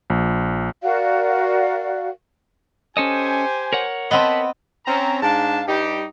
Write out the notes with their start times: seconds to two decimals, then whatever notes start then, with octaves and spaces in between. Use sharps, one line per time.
0.10 A#1
0.82 F#4 A#4 D5 F5
2.97 C#4 G4 A4 C5 D#5 G#5
3.73 A#4 C#5 F#5
4.11 B3 C4 D#5 A5 B5
4.86 C4 C#4 A#5
5.22 G#2 D4 F5 A5
5.67 G2 G3 D#4 G4